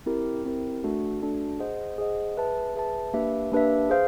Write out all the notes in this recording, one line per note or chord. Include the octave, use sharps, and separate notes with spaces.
C4 E4 G4 A#4
C4 E4 G4 A#4
A3 D4 F#4 A4
A3 D4 F#4 A4
G#4 C5 D#5 F#5
G#4 C5 D#5 F#5
G#4 B4 E5 A5
G#4 B4 E5 A5
A#3 D4 G4 B4 E5
A#3 D4 G4 B4 E5
G#4 C5 F5